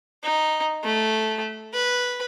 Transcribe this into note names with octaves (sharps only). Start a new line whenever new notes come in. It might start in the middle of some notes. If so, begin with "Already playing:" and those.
D#4
A3
B4